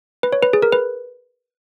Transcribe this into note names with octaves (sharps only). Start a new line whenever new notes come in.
B4
C#5
B4
G#4
A#4
B4